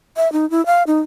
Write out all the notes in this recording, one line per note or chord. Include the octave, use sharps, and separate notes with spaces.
E5
D#4
E4
F5
D#4